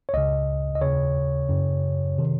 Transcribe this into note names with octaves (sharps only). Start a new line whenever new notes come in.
C#5
C#2 C#3 D#5
D#5
D#2 C#3 C#5
F#2 C#3
C3 D#3